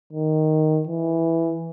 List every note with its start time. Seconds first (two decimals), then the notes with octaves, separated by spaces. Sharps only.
0.13 D#3
0.87 E3